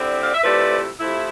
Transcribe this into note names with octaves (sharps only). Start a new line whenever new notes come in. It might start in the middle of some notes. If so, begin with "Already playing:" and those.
Already playing: D3 G3 C4 E4
F5
E5
C3 F3 A3 E4 B4 D5
C3 F3 A3 E4